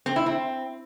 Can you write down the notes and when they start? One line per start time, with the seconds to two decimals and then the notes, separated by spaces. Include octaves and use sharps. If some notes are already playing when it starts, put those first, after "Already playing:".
0.06 C4
0.16 E4
0.26 C4